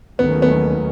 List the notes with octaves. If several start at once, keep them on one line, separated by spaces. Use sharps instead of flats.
D#2 D#3 F#3 A3 B3 C#4
B3